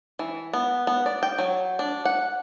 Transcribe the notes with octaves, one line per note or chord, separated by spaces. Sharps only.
E3
B3
B3
D5
G5
F#3
D4
F#5